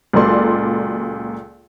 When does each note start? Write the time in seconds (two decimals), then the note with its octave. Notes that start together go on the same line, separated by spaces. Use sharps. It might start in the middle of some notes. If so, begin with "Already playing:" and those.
0.13 C#2 A#2 F#3 A4 D5 C6